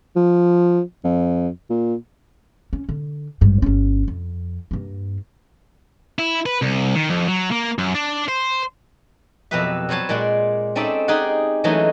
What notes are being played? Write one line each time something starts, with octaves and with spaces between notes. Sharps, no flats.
F3
F2
A#2
C#4
D3
G#1 G2
G1 C#4
F2
G2 A#3
E4
B4
C2
D#3
F2
F#3
A#3
F#2
D4
C5
F2 B2 F#3 G4 B4 E5
F#3 G3 B3 C5 C#5 A5
A#2 G#3 D5 F#5
C4 C#4 D#4 A4 D5 E5
D#4 G4 G#4 D5 F#5
E3 F#3 G#3 A3 C#4 D#4